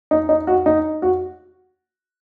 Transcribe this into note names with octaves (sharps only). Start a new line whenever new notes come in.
D#4
D#4
F#4
D#4
F#4